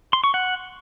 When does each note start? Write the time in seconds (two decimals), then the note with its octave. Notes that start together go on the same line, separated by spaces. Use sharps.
0.13 C6
0.24 C#6
0.34 F#5